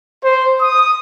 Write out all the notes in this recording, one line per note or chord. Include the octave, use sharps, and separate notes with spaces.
C5
D#6